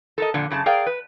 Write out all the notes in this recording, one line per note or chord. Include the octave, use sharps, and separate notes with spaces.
A4 A#4 D#5
F2 A#2 D3
F#2 C#3 F#4 A5
G#4 A#4 D5 F5 G5
B4